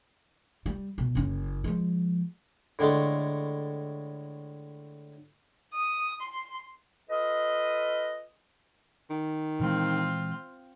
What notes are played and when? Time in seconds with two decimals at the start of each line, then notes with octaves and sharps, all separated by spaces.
0.66 G3
0.98 B2
1.15 F#1 C#4
1.64 F3 G#3
2.79 A2 D3 G#3 A3
5.73 D#6
6.21 C6
7.09 F4 A4 B4 D#5
9.10 D#3
9.60 A#2 E3 G#3 C4 F4